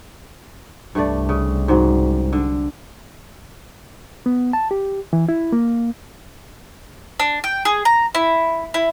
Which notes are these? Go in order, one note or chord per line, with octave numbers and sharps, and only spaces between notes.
C2 G2 A3 D5
C#3
G#2 F#3
D3
B3
A5
G4
E3
E4
A#3
D4
G5
G#4
A#5
E4
E4